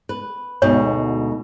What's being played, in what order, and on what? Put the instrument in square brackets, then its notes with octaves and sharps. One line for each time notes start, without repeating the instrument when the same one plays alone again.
[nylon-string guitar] B4
[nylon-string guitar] D2 G#2 B2 [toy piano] C#5